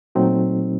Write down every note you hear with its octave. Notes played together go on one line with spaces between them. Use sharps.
A#2 F#3 A3 C4 D#4